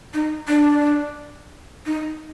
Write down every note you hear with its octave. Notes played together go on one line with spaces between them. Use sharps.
D#4
D4
D#4